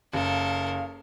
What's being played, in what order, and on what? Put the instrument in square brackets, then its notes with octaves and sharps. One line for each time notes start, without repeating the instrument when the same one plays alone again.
[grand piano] F#1 [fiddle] A4 A#4 [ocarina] F5